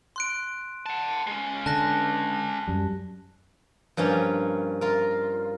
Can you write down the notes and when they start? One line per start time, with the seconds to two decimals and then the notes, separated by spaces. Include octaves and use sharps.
0.16 C6 F#6 D7
0.86 F#5 A5
1.27 G#3 C#4
1.66 D3 A5 F#6 A#6
2.67 F#2 G3
3.97 G2 F3 A#3 C#4
4.81 F4 A#4